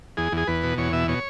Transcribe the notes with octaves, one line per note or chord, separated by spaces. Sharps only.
E2 G#4
E2 G#4
E2 B4
B2
E2 C#5
B2 E5
B2 C#5